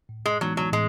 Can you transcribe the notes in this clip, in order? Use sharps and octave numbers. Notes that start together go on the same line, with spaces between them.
A2
G#3
E3 F#3 G#3 B3 D#4
F#3
A2 G#3